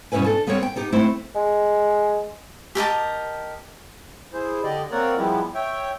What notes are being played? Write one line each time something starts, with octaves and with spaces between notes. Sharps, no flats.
G2 B2 C#4 E4 B4 G#5
D4 A4
G3 B3 C4 A#4 C#5
G5
B3 D#4 G4
A3 C4 E4 C5
G#3
G4 A#4 D#5 A5
E4 G#4 C5
D3 G4 D5 D#5
A#3 C4 A#4 C#5 D5 F#5
F3 G3 G#3 B3 E4 G4
C#5 E5 G5